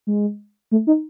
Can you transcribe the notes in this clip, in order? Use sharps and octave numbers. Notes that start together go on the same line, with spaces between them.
G#3
A3
D#4